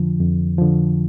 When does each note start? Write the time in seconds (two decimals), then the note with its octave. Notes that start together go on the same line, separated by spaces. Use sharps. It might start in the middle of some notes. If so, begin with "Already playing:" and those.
Already playing: F2 D3 F3
0.20 F2
0.58 D3 F3